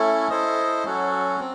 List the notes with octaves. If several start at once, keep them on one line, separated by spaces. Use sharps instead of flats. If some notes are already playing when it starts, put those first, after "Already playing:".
Already playing: A3 C#4 E4 A4
E4 A4 C5 D#5
F#3 C#4 F#4 A4
C4